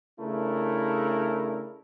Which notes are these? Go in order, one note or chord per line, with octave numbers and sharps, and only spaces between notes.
C#3 A3 D4 E4 A#4